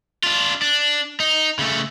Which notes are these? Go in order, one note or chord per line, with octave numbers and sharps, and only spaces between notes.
D4 F4
D4
D#4
C#3 A3